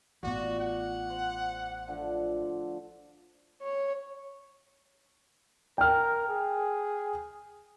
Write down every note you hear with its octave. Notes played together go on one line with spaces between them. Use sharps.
A1 B3 F4 F#4 D5
F#5
C5
D3 F3 A3
C#5
A#4 G5 F6
G#4